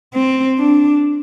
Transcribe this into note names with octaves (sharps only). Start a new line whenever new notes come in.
C4
D4